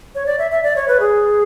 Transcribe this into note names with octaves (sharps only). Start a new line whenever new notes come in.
C#5
D5
E5
E5
D5
C#5
B4
G#4